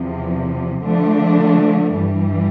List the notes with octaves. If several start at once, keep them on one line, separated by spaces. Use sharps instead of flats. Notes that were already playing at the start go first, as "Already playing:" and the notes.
Already playing: E2 C3 F3
D3 F3 A3 D4
G2 E3 G3